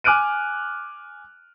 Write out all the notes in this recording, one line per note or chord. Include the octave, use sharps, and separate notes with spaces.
G#5 D6 F6 F#6 D7 D#7